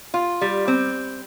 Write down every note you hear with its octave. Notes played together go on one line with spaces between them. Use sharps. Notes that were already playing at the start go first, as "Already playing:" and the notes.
F4
G3
C4